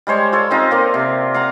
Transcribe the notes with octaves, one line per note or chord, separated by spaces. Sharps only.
G3 G#3 C5 C#5
F4 A4 C#5
C4 D#4 F4
A#3 A#4 D5
C3
F5 F#5 A#5